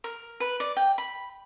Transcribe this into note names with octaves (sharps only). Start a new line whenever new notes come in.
A#4
B4
D5
G5
B5